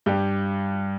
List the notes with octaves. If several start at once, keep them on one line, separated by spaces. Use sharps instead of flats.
G2 G3 G4